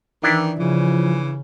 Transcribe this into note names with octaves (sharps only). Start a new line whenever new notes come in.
D#3 E3 D4 E4
C#3 E3 F3